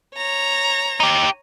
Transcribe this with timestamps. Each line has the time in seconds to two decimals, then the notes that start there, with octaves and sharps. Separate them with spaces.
0.16 C#5 A#5
1.00 D#4 G4